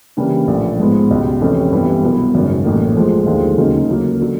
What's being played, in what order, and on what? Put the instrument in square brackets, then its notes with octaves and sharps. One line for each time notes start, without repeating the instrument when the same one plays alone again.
[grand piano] C#3 E3 G3 A#3 D4
A#1 A2 E3
G#2 F3 G#3 B3
C#2 B2 G3
F2 C3 E3 A3 C#4
G2 E3 G3 B3 E4
C2 B2 F#3 B3
G#1 F#2 C#3
A1 A2 F#3 A#3
A2 F3 G#3
D#2 D3 F3 G#3
D2 C#3 F#3 A#3 D#4
C#3 F#3 A#3
D3 F#3